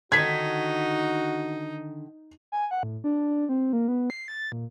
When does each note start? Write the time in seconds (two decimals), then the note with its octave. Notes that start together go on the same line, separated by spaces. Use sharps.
0.12 D3 D#3 D#4 F#4 G#6 B6
2.52 G#5
2.71 F#5
2.83 A2
3.04 D4
3.49 C4
3.73 A#3
3.88 B3
4.10 C7
4.28 A6
4.52 A#2